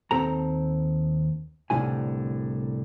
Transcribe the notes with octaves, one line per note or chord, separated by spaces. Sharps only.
D#2 C4 A4 A#5
C2 A2 D3 A3 F4 G#5